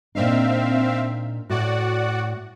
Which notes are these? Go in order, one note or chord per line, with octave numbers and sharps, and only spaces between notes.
A#2 C4 D4 D#4 E5 F5
A2 F#4 D5 F#5